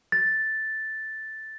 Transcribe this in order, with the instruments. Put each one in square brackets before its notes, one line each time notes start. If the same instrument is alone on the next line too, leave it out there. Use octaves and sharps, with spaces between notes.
[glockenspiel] A6